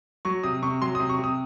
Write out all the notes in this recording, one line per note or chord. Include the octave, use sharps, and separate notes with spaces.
F#3 C#6
C3 D#6
C3 C#6
F#3 C6
D#6
C3
C#6
C3
D#6